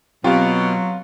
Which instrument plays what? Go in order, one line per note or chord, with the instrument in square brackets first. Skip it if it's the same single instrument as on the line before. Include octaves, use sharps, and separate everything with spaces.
[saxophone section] B2 [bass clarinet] F#3 [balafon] C4 G4 [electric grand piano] F4 F5